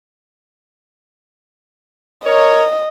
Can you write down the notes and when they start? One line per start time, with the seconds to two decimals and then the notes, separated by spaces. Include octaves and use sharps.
2.26 A#4 C#5 D#5